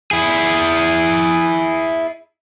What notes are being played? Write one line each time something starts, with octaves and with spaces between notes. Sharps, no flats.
E4 G#4